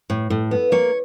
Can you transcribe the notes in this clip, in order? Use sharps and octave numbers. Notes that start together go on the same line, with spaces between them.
A2
A2
B3
A#3 C#5